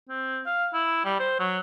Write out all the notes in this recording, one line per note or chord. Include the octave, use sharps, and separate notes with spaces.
C4
F5
E4
G3
C5
F#3